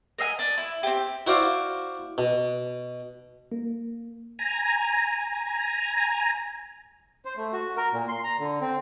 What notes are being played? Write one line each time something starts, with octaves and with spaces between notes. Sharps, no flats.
A#4 D#5 E5 G#5
D4
E4
C4 G4
E4 F#4 C5 D5 F5
B2
A#3
G#5 A#5
C5
A3
F#4
A#4
A#2
C6
A#5
D3
C4